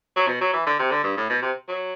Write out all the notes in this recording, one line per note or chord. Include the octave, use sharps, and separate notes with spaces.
F#3
B2
F#3
E3
D3
C3
D3
G2
A2
B2
C3
F#3